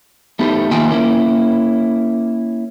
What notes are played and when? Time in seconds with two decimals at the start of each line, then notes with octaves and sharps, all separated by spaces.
0.39 A3 B3 D#4 G4
0.71 D#3 A#3 F4 E5 G5 G#5
0.91 A#3 C#4 E4